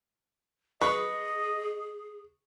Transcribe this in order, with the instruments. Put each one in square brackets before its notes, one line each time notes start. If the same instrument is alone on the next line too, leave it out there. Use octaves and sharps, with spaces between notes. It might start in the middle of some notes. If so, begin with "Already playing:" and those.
[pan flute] G#4 [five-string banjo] B4 [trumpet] D#5 [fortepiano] C#6